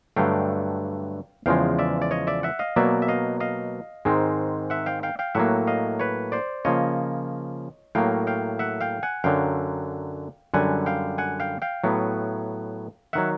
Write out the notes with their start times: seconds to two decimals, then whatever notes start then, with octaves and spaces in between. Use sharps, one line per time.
0.16 G2 D3 F#3 A3 F5 G5
1.46 E2 C#3 F3 G#3 F5 G5
1.79 D5 E5
2.02 D5
2.11 C#5 D#5
2.27 D5 E5
2.43 E5 F#5
2.59 D#5 F5
2.76 B2 F#3 A#3 D5 E5
3.02 E5
3.08 D#5 F5
3.40 D#5 F5
4.05 G#2 D#3 G#3 C4
4.70 E5 F#5
4.86 F5 G5
5.03 F5 G5
5.19 F5 G5
5.35 A2 F#3 A#3 E5 F#5
5.67 D#5 F5
6.00 B4 C#5
6.32 C5 D5
6.65 C#3 F3 A#3 C#5 D#5
7.95 A2 F#3 A#3 F5 G5
8.27 F5 G5
8.59 E5 F#5
8.81 F5 G5
9.03 F#5 G#5
9.24 F#2 D3 F#3 F5 G5
10.54 F#2 D3 G3 F#5 G#5
10.86 F5 G5
11.18 F#5 G#5
11.40 F5 G5
11.62 F5 G5
11.84 A2 F#3 B3
13.13 D#3 F#3 E5 F#5